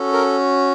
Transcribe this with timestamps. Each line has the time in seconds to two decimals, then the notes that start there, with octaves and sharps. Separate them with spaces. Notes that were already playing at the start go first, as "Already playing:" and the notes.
Already playing: C#4 F#4 A4
0.13 A#4